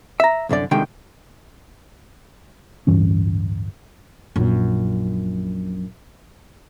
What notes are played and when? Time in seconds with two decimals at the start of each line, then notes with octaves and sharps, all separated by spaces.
0.20 E5 A#5
0.49 C2 F#2 D3 D5
0.71 C2 D3 D#3 G#3 G4 G5
2.87 D1 G2 E3 C#4
4.36 A#1 F#2